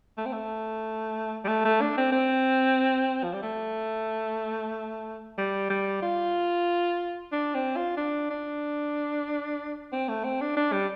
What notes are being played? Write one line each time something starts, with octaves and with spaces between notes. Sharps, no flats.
A3
C4
A3
G3
A3
A3
D4
C4
C4
F3
G3
A3
G3
G3
F4
D4
C4
F4
D4
D4
C4
A3
C4
D4
D4
G3